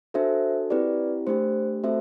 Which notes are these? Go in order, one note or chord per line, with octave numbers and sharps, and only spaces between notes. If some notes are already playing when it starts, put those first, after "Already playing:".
D4 F#4 A4 C5 E5
C4 E4 G4 B4 D5
A3 D4 G4 C5
A3 C4 F#4 A4 C5 E5